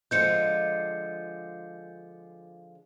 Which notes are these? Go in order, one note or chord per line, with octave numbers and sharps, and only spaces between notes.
D3 F3 G#3 G6 C#7